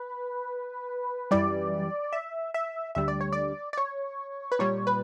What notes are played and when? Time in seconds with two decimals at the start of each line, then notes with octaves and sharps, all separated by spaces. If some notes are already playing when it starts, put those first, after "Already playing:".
Already playing: B4
1.31 F#2 E3 G3 D5
2.13 E5
2.54 E5
2.95 D2 D3 G3 E5
3.08 D5
3.21 C#5
3.33 D5
3.73 D5
3.78 C#5
4.52 B4
4.59 A#2 G3 C#5
4.87 B4